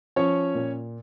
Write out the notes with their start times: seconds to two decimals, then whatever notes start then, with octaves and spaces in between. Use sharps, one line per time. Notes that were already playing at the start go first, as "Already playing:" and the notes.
0.16 F3 C#4 C#5
0.55 A#2